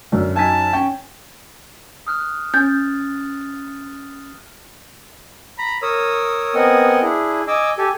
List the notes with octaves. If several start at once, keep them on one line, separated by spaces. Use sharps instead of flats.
F#2 D3
F#3 D#4 G#5 A5 G#6 B6
C#4 G5
D#6 F6 F#6
C#4 G6 A6
A#5 B5
A#4 C#5 D#6 E6
B3 C4 A#4 D#5 F#5 G#5
D4 E4 G#4
D#5 G#5 D6 E6
G4 A4 G#5